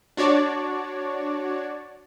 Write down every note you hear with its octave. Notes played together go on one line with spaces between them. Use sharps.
D4 F#4 C#5 D5